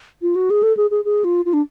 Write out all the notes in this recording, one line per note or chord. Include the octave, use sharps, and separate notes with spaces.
F4
F#4
G#4
A4
G#4
G#4
G#4
F4
F4
D4